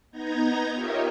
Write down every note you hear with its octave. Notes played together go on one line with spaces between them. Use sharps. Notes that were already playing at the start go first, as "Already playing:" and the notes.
B3 D#4 A#5 G6 G#6 A#6
F4 G4 A#4 C#5 D#5 E5